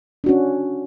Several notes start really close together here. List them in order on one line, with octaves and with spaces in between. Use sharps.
D4 F#4 C#4